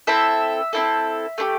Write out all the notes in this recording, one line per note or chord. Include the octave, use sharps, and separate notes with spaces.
C4 E4 A4 E5
C4 E4 A4
A3 E4 G4